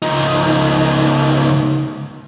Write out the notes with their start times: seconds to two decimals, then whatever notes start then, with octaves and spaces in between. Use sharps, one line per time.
0.02 C#2 D#4